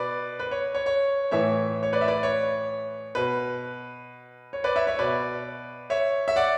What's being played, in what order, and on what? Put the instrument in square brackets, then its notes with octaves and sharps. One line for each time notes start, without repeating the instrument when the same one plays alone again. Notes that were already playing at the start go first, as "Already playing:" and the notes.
Already playing: [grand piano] B2 B4 D5
B4
C#5
C#5
C#5
A2 E3 C#5 E5
C#5
B4 D5
E5
B4 D5
C#5
B2 B4
C#5
B4 D5
C#5 E5
C#5 E5
B2 B4 D5
C#5 E5
E5
D5 F#5